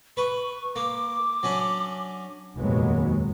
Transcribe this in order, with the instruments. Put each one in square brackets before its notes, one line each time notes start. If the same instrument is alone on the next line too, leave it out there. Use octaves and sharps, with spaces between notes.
[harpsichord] B4 [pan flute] C#6
[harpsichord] A#3 [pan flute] D6
[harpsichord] F#3 C#4 D4
[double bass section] F1 D#2 A#2 F#3 G#3 B3